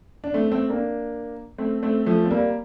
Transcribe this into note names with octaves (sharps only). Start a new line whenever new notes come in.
D4
A3 C4
A3 C4
A#3 D4
A3 C4
A3 C4
F3 A3
C4
G3 A#3